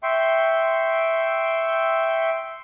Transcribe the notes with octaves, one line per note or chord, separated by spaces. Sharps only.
E5 G5 C6 C#6